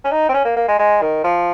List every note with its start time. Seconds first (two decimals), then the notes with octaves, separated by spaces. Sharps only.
0.04 C#4
0.12 D#4
0.29 C4
0.34 C#4
0.45 A#3
0.57 A#3
0.68 G#3
0.79 G#3
1.02 D#3
1.24 F3